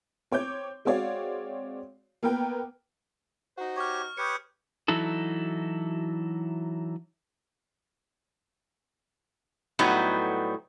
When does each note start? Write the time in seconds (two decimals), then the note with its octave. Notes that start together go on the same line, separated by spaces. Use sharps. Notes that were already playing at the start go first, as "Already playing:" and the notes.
0.31 C4 C#5 D6 G6
0.85 G#3 C4 F#4 C#5 D5 F5
2.23 A#3 B3 A#4 B4 G5
3.58 D#4 F#4 C5
3.76 G4 C#5 C#6 F6
4.17 G4 B4 C#5 D#6 G6 C#7
4.88 E3 F#3 D#4 E4 F#4 A4
9.79 A2 F#3 G3 B3 D#4